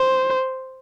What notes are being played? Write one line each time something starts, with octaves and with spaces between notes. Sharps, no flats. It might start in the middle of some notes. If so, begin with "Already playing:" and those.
Already playing: C5